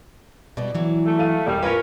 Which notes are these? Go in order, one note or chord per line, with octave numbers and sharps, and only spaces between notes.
B2 G3 G#3 D5
E3 F#3
A3
A4 F5 D#7
E1 G3
A2 C#4 F4 A#4 B4